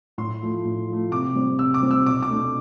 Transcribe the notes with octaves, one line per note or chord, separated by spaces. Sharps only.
A2 C6
F3 A3
A2
F3 A3
C3 D6
G3 C4
C3 E6
D6
G3 C4
E6
B2 D6
D6
A3 D4